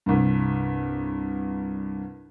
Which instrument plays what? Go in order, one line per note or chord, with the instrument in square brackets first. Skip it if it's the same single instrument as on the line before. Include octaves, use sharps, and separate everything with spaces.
[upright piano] C2 G2